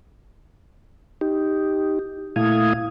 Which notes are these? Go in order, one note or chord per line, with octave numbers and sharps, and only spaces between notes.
D#4 G4
A#2 A3 E4 F5 D#6 G#6